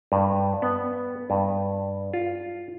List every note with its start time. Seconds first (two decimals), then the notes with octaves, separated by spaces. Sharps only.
0.12 G2
0.62 B3
1.30 G2
2.14 F4